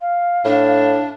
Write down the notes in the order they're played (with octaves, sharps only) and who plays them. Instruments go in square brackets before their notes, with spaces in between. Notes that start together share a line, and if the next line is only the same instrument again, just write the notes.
[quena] F5
[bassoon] A2 [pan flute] D4